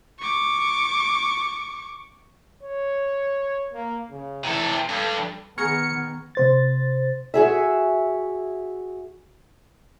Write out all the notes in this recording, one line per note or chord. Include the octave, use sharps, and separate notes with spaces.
C#6 D6
C#5
A#3
C#3
C3 E3 A4
G2 A4
D#3 B3 G#4 A#5 C#6 F6 G#6 C#7
C3 C5 A6
F#4 G#4 E5